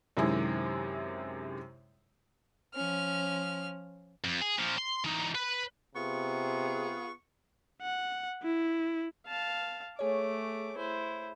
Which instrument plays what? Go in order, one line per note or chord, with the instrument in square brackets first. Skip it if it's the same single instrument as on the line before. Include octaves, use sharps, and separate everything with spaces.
[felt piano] F#2 C3 D#3 G#3 E4
[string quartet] F3 C#4 F6
[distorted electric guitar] F2
G#4
A#2 F3
C6
E3 D#4
B4
[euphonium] C3 [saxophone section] B3 F4 G#4 [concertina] C#6
[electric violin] F#5
E4
[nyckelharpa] F5 A5
[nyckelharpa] A3 D6 [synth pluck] G#4 C#5
[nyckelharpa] E4 C5